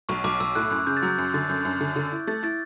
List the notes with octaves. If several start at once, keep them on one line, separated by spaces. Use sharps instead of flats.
B1 C#6
B1 D6
B1 E6
A2 F#6
F#2 F#6
C#3 G6
A6
F#3
G6
F#2
D3 A6
F#2 G6
F#2
D3
D3
E4
A3 A6
E4 A6